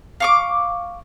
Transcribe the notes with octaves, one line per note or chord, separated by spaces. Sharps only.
F5 C#6 D6